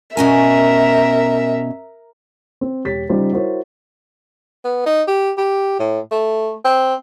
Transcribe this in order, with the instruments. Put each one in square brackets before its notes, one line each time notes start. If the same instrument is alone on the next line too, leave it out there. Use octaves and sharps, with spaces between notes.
[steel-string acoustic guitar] B2 C#4 G#5 [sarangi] A#4 [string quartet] E5
[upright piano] C4
E1 G4 C#5 A6 B6
C#3 G3 D#4 F4 C5
E4 F#4 A#4 C5 C#5
[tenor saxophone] B3
D#4
G4
G4
A2
A3
C4